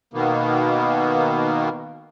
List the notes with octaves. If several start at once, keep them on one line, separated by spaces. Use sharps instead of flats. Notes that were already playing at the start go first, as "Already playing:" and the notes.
B2 D#3 A#3 B3